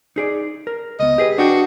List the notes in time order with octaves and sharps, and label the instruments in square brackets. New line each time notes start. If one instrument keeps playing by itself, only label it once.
[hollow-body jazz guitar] D#4 G#4 D5
A#4
[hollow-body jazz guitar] C#2 B3 [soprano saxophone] D#5
[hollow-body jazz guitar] G4 G#4 B4
[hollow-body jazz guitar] D4 D#5 G5 [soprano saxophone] F#4